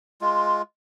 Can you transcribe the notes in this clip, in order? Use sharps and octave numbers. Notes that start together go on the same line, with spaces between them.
G#3 F4